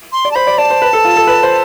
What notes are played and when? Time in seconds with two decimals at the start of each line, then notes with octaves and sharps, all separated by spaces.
0.12 C6
0.25 D5
0.32 A5
0.35 C5 B5
0.47 D5
0.58 D5 A5
0.70 C5
0.82 B4
0.93 A4
1.05 F4
1.16 A4
1.27 B4
1.43 C5